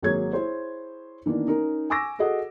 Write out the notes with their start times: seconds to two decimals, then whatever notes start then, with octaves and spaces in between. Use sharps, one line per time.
0.02 G#1 F#3 A#3 G#4 C#5 G#6
0.32 E4 G#4 C5 C#5
1.26 D#3 E3 A#3 B3 D4
1.47 C#4 D#4 A#4
1.90 G#5 C#6 D6 E6 A#6
2.19 F#4 G#4 A4 D#5 F#5